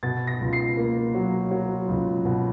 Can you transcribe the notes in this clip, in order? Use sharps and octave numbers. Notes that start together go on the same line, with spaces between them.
B2 A6
A#6
C#2
C7
A#3
F#3
F#3
C#2
B2